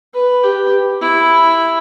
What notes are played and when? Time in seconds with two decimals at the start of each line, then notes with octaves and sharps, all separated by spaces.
0.15 B4
0.43 G4
1.01 E4